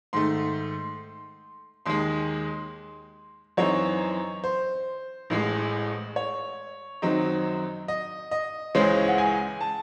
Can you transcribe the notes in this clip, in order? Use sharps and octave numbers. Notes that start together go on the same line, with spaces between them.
G#2 D#3 A3 C6
D#2 D#3 G#3 C6
F#2 E3 C4 D#4 C#5
C5
A1 A2 G#3
C#5
F#2 D#3 F#3 C4 D#4
D#5
D#5
C#2 C#3 E3 G#3 C#4 C5
F#5
G#5
A5